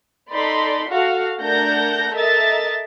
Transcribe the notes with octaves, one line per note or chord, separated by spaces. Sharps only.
D#4 A4 D5 B5 C6
F#4 A4 F5
A3 D4 A#4 F#5 G6 A#6
A4 A#4 D#5 E5 A6